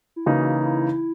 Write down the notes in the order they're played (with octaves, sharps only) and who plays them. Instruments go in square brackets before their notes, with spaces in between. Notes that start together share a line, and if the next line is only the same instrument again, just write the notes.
[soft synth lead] E4
[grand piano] C#3 E3 A#3 D#4 [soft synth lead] F#4
[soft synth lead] E4